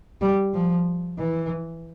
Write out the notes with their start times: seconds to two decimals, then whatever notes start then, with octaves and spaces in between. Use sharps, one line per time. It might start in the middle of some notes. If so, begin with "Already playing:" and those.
0.21 G3
0.54 F3
1.19 E3